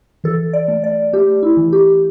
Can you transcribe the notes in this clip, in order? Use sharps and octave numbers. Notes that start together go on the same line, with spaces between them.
E3 A4
D5
A3
D5
A3 G4
E4
E3
G4